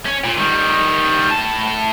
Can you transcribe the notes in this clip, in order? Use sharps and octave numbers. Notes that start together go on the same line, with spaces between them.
C#4
A#2
D#3 G3
A2 A5